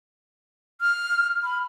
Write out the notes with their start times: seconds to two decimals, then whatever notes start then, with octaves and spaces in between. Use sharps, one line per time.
0.81 F6
1.44 B5